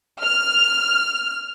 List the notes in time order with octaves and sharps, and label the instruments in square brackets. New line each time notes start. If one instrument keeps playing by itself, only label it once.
[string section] F6